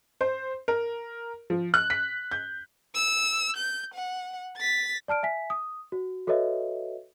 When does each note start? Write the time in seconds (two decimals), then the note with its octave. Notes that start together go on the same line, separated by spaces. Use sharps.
0.21 C5
0.68 A#4
1.50 F3
1.74 F#6
1.90 B6
2.31 G6
2.95 E6
3.56 G6
3.94 F#5
4.57 A6 B6
5.08 D5 A5 F6 D7
5.23 E5 G#5 B6
5.50 D#6
5.92 F#4
6.27 F#4 A4 B4 C#5 D#5 E5